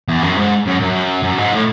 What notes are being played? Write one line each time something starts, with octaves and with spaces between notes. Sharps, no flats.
E2
F#2
G#2
F#2
F#2
F#2
G#2
A2